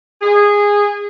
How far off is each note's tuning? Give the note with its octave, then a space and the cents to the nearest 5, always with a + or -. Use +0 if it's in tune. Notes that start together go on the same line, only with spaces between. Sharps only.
G#4 -15